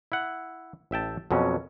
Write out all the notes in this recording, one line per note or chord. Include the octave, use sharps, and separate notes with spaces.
E4 F#5
A1 E5 G5 A5
F2 B2 F#3 C#4